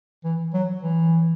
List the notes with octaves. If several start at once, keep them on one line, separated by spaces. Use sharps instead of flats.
E3
F#3
E3